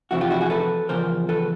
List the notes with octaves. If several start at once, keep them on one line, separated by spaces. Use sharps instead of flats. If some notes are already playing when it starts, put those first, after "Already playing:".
F2 C3 E3 E4 F#4
F4 G4
E4 F#4
F#4 G#4
A4 B4
E2 C#3 F3 A#4 C5
A4 B4